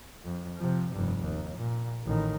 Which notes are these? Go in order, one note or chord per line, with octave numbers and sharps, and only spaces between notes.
F2
C3 F3
F1 G2
D#2
A#2
A1 D#3